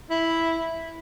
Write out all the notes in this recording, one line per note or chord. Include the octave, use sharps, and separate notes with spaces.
E4